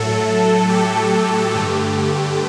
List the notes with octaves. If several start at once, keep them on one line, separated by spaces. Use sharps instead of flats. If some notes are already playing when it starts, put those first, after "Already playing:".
Already playing: A2 F#3 A3 A4
G4
G2 D3 A3